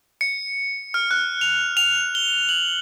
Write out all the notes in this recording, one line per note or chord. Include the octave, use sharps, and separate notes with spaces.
C#7
F6
F#6
F7
F7
G7
F#7